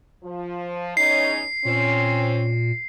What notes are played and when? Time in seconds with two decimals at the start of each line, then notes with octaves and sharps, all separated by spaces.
0.23 F3
0.97 E2 C#4 D#4 C7
1.65 A#2 C4 C#4